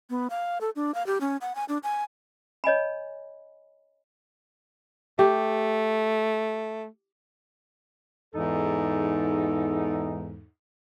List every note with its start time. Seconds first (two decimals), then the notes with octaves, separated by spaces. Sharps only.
0.10 B3
0.30 F5
0.61 A4
0.76 D4
0.94 F5
1.07 G4
1.21 C#4
1.41 F#5
1.55 G#5
1.69 D4
1.84 G#5
2.64 C#5 D#5 G#5 B5
5.19 A3 G4
8.34 E2 G#2 D#4 A4